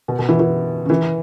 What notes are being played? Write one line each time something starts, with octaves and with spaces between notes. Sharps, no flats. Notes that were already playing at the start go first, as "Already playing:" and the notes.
B2
B2
E3
E3
C#3
E3